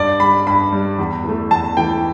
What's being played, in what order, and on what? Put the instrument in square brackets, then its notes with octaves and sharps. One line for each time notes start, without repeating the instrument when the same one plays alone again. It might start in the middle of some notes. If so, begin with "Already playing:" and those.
Already playing: [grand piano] G2 D5
G3 B5
G2 B5
G3
E2
E3 A3
E2 A5
E3 A3 G5